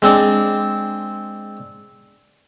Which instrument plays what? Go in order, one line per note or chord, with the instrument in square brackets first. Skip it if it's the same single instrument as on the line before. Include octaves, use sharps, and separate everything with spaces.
[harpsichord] G#3 C4 D4